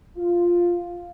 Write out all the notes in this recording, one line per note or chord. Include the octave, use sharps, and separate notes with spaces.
F4